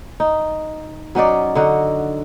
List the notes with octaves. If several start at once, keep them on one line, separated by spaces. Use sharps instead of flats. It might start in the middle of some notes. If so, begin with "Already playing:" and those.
D#4
F#3 C#4 D#4 D5
D3 D#4 F#4